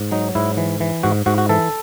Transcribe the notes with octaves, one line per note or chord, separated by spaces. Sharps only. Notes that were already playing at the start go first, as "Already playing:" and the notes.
Already playing: G#2
F#3 D#4
G#2 E4
E3
E3
G#2 F#4
G#2 F#4
F#4
E3 A4